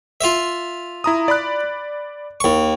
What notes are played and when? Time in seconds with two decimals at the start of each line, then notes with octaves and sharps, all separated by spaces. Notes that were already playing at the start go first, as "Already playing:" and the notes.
0.21 F4 E5
1.04 E4 A#5 D#6
1.28 D5 B5 F#6
2.40 D#2 C#6